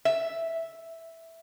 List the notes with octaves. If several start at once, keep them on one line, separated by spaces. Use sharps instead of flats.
E5